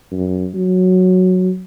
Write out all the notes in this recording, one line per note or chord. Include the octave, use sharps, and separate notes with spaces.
F#2
F#3